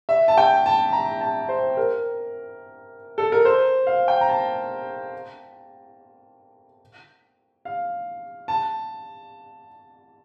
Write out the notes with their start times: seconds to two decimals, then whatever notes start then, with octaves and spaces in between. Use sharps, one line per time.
0.09 E5
0.28 A5
0.38 G5
0.66 A5
0.93 A#5
1.21 A5
1.49 C5
1.77 A#4
3.18 A4
3.32 A#4
3.45 C5
3.87 F5
4.08 G5
4.21 A#5
4.29 A5
7.65 F5
8.48 A5